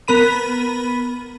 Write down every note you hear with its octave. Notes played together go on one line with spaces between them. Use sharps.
B3 A#4 B5 D#7